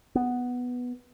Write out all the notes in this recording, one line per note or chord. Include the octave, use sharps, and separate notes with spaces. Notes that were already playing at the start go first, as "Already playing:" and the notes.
B3